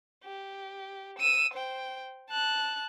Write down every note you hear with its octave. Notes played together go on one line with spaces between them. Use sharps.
G4
E6 D#7
C5 G5
A5 F#6